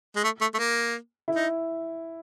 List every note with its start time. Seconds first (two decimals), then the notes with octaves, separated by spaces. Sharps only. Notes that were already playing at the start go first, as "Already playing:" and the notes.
0.16 G#3
0.24 A3
0.41 A3
0.54 A3
0.59 A#3
1.28 E4
1.35 D#4